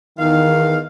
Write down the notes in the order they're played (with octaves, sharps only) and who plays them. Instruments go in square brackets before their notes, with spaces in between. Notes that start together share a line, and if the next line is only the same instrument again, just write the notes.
[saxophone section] E2 F5 [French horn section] D#3